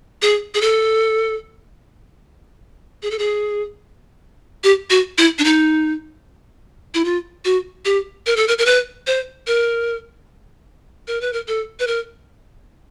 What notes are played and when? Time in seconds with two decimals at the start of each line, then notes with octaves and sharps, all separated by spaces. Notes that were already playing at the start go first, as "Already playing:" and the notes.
0.22 G#4
0.54 G#4
0.61 A4
3.03 G#4
3.11 A4
3.19 G#4
4.64 G4
4.90 F#4
5.18 E4
5.39 D4
5.44 D#4
6.94 E4
7.05 F4
7.45 F#4
7.85 G4
8.26 A#4
8.36 A4
8.48 A#4
8.58 A#4
8.66 B4
9.07 C5
9.47 A#4
11.08 A#4
11.21 B4
11.33 A#4
11.48 A4
11.80 B4
11.87 A#4